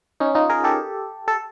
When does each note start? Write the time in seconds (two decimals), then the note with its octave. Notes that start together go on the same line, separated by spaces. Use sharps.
0.20 C#4 D#4
0.35 D#4 F4
0.50 G#4 A#4
0.64 G4 A4
1.28 A4